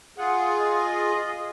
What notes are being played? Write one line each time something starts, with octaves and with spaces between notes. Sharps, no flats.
F4 G#4 F#5
D#5